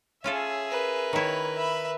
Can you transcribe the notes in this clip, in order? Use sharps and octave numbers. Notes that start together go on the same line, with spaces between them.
C#4 F4 G#4 A4 E5
A#4 B4
D#3 E4 C#5
E5 B5